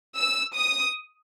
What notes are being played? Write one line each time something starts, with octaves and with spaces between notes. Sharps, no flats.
E6
D#6